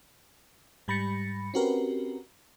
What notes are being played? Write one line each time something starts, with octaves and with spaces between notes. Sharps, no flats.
G#2 G3 B5 A6 A#6 C#7
C4 C#4 F#4 G4 A#4 B4